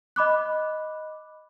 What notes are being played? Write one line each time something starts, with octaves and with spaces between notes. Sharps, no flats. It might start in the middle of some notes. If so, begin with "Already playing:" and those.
D#5 B5 D6 F#6